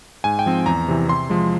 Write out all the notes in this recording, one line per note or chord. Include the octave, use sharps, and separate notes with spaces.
G#2 G#5
G5
F3 C4
E2 A#5
C3 E3
C3 C6
F3 G#3